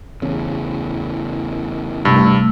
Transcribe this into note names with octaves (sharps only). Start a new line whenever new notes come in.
E2 C#3
G2 C3 G3 A3 E6